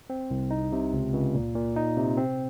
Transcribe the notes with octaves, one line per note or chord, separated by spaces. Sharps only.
C4
C2
D#4
C3
C#2
C#2
A#2
A#2
D#4
C3
C4